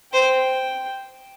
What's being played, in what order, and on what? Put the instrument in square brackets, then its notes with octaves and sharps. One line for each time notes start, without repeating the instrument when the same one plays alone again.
[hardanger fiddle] C5 [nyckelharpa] G5